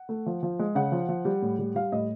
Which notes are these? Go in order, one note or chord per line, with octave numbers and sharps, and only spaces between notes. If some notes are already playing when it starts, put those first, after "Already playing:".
Already playing: F#5
A3
F3
F3
G#3
C#3 F#5
F3
F3
G3
A2
G3
G3 F5
A2 D#5